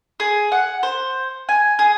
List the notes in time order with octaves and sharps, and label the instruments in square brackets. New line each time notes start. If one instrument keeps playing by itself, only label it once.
[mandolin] G#4
F#5
C5
G#5
G#4